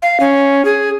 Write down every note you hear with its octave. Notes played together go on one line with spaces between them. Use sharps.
F5
C#4
G#4